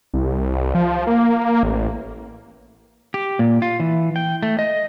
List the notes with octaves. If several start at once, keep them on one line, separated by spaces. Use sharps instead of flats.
C2
F3
A#3
A1
G4
A#2
F4
E3
G5
A3
D#5